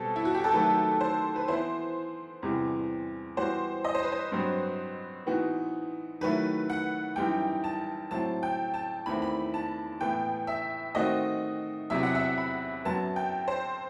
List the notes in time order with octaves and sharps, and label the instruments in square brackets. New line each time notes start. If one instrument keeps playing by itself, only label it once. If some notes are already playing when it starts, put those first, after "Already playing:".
Already playing: [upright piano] B2 G3 C4 [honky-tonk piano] A4
[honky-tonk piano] E4
F#4
G4
A4
[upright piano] D#3 F#3 A3 [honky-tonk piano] B4
[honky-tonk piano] C5
B4
[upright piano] E3 B3 E4 [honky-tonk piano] C5
[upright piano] E2 C3 E3 G3
[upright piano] E3 G3 B3 F#4 [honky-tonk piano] C5
[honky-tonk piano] D#5
C5
B4
C5
[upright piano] G2 F#3 C4
E3 B3 D#4 F#4
[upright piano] D#3 F#3 A3 E4 [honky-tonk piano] B4
[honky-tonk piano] F#5
[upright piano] F#2 E3 G3 D#4 [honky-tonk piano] G5
[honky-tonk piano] A5
[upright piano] A2 F#3 C4 E4 [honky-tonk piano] A5
[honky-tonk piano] G5
A5
[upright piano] E2 D#3 A3 C4 E4 [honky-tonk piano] B5
[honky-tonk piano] B5
A5
[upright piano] A2 E3 B3 [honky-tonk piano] G5
[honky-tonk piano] E5
[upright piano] D#3 A3 C4 F#4 [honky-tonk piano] D#5
[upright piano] E2 C3 F#3 [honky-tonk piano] E5
[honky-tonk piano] F#5
E5
B5
[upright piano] F#2 F#3 B3 [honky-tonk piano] A5
[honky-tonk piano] G5
C5